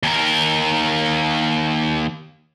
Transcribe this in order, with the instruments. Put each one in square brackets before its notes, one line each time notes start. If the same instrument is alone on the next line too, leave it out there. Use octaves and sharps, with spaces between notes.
[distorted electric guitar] D#2 A#4